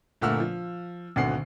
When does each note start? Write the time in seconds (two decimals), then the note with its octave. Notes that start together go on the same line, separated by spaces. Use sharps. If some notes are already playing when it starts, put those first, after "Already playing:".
0.21 G1 A#2 A3 F#5 E6 F6
0.40 F3
1.16 G#1 D2 B2 D3 F#5 C7